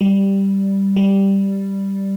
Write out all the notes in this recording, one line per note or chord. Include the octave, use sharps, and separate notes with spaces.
G3
G3